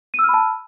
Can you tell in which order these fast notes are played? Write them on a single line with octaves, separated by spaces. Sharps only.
D#7 E6 F6 B5 A5